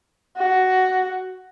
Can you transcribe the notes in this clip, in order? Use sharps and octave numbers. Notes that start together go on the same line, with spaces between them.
F#4